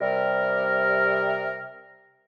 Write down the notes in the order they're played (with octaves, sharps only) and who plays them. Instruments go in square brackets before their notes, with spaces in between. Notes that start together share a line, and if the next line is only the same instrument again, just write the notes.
[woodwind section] C3 G3 A#4